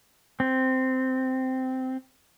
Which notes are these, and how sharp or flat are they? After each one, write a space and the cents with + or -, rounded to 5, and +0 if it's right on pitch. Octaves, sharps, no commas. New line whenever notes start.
C4 -10